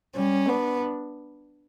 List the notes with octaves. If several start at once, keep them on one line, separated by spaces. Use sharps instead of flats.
G3 C#4
B3 D4